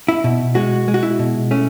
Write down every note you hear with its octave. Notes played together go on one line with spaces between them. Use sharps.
E4
B2
G#3 F#4
G#3
F#4
E4
B2
A3 C#4